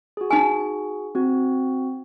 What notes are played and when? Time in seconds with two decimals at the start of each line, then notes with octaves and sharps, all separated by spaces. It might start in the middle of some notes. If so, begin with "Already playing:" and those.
0.17 F#4 G#4
0.31 D#4 G#5
1.15 C4 F#4